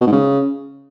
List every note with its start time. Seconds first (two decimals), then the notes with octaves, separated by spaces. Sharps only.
0.01 B2
0.07 G#2
0.12 C#3